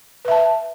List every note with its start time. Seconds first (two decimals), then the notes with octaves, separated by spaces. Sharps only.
0.25 B4
0.28 E5
0.31 A5